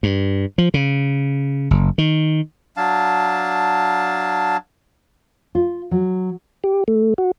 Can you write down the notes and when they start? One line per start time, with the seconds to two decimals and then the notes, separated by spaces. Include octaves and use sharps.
0.03 G2
0.58 F3
0.74 C#3
1.71 F#1
1.98 D#3
2.77 F#3 D4 F5 A5
5.55 F4
5.91 F#3
6.64 G4
6.88 A3
7.18 F#4